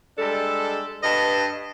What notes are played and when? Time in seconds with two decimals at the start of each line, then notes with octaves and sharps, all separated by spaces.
0.18 G3 G#3 D4 A4
1.03 G2 B4 D#5 A5